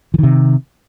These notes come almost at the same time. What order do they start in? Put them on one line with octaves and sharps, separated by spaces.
E3 D#3 C3